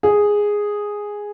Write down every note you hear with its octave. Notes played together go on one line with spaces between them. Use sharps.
G#4